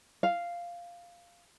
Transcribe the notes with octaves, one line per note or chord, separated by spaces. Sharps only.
F5